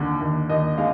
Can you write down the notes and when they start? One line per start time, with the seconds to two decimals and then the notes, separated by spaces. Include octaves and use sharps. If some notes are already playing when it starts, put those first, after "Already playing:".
Already playing: D#2 D3
0.21 D#2
0.50 D#2 D#5
0.78 G#3 F5